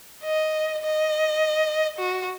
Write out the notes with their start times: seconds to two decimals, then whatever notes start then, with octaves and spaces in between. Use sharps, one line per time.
0.23 D#5
0.82 D#5
1.98 F#4